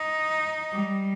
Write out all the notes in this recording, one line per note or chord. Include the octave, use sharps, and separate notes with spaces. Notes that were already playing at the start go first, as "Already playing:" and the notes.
Already playing: D#4
G3